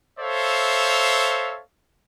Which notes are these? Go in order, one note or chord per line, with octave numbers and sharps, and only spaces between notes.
A4 C5 C#5 E5 F5